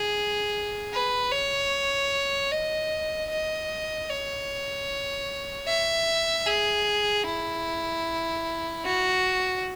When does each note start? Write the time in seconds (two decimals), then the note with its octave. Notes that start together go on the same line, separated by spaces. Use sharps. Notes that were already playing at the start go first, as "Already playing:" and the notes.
Already playing: G#4
0.93 B4
1.32 C#5
2.52 D#5
3.30 D#5
4.10 C#5
5.68 E5
6.47 G#4
7.26 E4
8.85 F#4